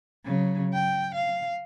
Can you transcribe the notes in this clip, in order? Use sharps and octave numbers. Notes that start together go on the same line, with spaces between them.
C#3 F#3
G5
F5